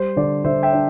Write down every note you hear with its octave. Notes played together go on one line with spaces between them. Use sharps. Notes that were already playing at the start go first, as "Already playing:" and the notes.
Already playing: G3 C5
D3 D5
D3 C5 E5
E5 G5
D4